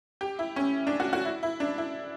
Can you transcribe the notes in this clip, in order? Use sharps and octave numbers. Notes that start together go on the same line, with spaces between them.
G4
E4
C#4
D4
F#4
F#4
E4
E4
D4
E4